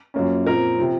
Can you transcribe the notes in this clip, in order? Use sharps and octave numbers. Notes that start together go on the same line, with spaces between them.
F#2 F3 A#3 C#4
A#2 F3 C4 A#4
C3 F3 C4